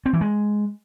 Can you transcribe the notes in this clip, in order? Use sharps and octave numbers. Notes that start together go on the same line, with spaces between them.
C4
E3
G#3